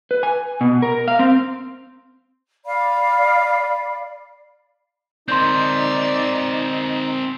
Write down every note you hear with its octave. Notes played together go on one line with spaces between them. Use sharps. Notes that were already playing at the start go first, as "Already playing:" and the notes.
B4
G#5
B2
A#4
F5
C4
D5 F5 B5
C4 D#4 A#4 D5 C6 G6